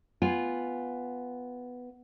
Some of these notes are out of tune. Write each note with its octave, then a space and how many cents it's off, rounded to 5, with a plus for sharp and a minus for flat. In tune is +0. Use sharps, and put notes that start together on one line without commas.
B3 +5 F4 +0 G#5 -15